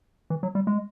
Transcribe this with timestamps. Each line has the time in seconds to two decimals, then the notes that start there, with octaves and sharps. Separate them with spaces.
0.30 E3
0.43 F#3
0.55 G3
0.67 G#3